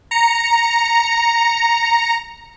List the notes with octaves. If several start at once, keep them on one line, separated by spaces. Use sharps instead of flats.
A#5 C#7